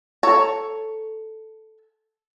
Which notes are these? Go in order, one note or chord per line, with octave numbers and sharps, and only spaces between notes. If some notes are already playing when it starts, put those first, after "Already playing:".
A4 C#5 A#5